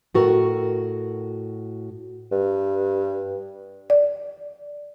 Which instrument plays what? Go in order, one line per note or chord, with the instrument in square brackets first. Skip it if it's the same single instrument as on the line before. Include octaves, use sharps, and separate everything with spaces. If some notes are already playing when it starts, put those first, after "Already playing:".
[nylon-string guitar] A2 F#4 A4 A#4
[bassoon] G2
[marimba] D5